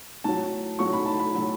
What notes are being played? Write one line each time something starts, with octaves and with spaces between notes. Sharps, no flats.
A2 F#3 A5
A2 F#3 C#6
B5
A5
B5
A2 F#3